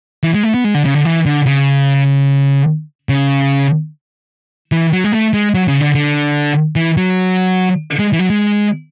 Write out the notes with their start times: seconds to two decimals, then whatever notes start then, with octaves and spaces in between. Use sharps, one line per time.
0.23 E3
0.34 G#3
0.43 A3
0.54 B3
0.64 G#3
0.74 D3
0.85 C#3
0.95 D3
1.05 E3
1.26 D3
1.46 C#3
3.09 C#3
4.72 E3
4.93 F#3
5.04 G#3
5.12 A3
5.34 G#3
5.54 F#3
5.68 C#3
5.81 D3
5.95 D3
6.76 E3
6.97 F#3
7.99 G#3
8.13 E3
8.19 F#3
8.30 G#3